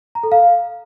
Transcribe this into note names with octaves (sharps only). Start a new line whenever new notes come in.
A#5
A4
F5